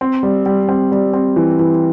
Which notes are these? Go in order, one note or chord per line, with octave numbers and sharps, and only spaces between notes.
C4
G3
G3
C4
G3
C4
E3
E3